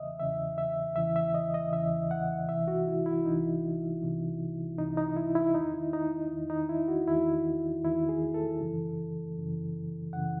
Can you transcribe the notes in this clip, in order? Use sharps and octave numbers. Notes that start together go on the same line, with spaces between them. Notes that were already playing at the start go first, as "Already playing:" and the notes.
Already playing: E2 C#3 E3 D#5 E5
E2 C#3 E3 E5
E5
E2 C#3 E3 E5
E5
D#5
D#5
E2 C#3 E3 E5
F#5
C2 C3 E3 E5
F#4
E4
E4
C2 C3 E3 D#4
C2 C3 E3
C2 C3 E3 D#4
D#4
E4
E4
E2 D#3 D#4
E4
D#4
E2 D#3
D#4
E4
F#4
E2 D#3 E4
E2 D#3 E4
G#4
A4
F#2 C#3 E3
F#2 C#3 E3
F#2 C#3 E3 F#5